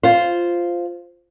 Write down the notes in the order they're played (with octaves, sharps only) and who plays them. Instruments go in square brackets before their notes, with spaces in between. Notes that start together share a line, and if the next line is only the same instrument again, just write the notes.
[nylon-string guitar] F4 C5